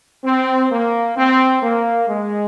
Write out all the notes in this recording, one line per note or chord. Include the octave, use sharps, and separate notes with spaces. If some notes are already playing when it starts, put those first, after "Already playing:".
C4
A#3
C4
A#3
G#3